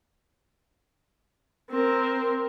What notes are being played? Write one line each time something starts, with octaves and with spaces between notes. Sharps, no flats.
C4 A#4